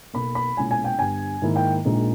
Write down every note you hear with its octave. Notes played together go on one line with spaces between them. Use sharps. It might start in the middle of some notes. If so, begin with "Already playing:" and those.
B1 B2 A#3 B5
B5
B1 A#2 G#3 C#4 E4 G#5
G#5
G5
G1 G2 G3 G#5
G#2 D#3 A#3 E4
G5
A#1 A#2 G#3 D#4